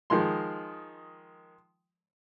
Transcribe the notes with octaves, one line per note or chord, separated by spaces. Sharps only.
D#3 F3 G#3 C6